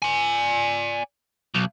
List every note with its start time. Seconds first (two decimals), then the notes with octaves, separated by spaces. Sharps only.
0.02 D5 G#5
1.55 B1